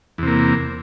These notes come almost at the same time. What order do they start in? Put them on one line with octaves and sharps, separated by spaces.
E2 C3 A#3